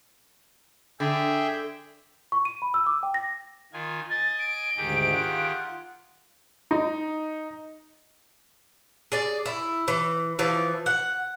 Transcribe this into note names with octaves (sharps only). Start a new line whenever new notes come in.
D3 G#4 E5 G5
C#6
D#7
B5
E6
D6
G5
A#6
D#3 F4 G#5
D#5 G#5 A6
D7
D2 G#2 D#3 G4 G#4
F4 F#5
D#4
G#4 D5
E4
E3
E3 F3
F#5